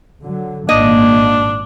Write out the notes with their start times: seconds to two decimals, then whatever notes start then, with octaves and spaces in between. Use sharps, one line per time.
0.22 D3 F#3
0.69 G#1 A#2 A#3 D4 D#5